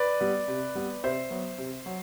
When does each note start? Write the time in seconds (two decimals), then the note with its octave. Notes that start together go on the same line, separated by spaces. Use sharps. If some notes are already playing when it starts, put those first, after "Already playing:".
Already playing: B4 D5
0.20 G3 B3
0.48 C3
0.75 G3 B3
1.04 C3 C5 E5
1.30 F#3 B3
1.58 C3
1.86 F#3